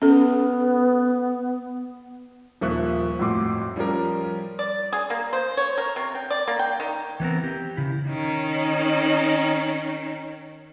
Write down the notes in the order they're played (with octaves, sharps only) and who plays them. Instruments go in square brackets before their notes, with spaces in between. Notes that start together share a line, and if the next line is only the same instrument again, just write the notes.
[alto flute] B3 [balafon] C#4 A4
[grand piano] D#1 F3 A#3 E5 C#6 F#6
F2 A2 F#4 C6 D6
F3 G3 C#4 F4 A#4
[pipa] D5
G#4
A#3
C5
C#5
A#4
C3
G5
D5
A#3
G5
D#3
[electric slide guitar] E3 B3 C4 A#4
G4
C#3 E4
[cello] D#3 C#4